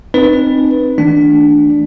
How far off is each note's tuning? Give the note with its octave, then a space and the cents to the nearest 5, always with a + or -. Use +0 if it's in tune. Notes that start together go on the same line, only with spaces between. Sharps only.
C4 +5 D#4 -20 B4 -10
E3 -40 A3 +0 D4 +0